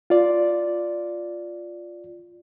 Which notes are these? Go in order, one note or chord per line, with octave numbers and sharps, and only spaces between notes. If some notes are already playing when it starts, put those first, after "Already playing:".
F4 D5